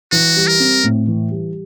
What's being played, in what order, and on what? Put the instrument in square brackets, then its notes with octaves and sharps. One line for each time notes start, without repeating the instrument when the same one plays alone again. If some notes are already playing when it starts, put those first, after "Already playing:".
[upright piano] E3 [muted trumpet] F#4
[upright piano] G3
[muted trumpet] A#4
[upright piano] C4
A2
E3
G3